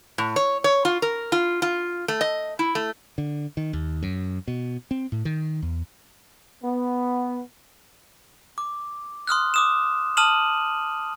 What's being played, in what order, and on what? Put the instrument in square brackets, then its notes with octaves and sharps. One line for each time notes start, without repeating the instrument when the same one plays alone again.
[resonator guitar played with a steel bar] A2
C#5
C#5
F4
A#4
F4
F4
A3
D#5
E4
A3
[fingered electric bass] D3
D#3
D#2
F#2
B2
C4
A2
D#3
E2
[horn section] B3
[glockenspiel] D6
C6 D#6 F6 F#6
D6 D#6 E7
A5 D#6 F6 D#7 E7 F#7